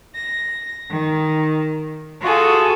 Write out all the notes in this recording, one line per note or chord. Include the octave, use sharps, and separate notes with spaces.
A#6
D#3
F4 F#4 G#4 A4